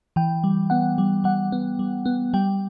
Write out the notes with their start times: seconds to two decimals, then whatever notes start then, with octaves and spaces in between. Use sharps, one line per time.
0.16 E3 G5
0.44 G3
0.70 B3 F#5
0.98 G3
1.24 G3 F#5
1.52 B3
1.79 G3
2.06 B3
2.34 G3 G5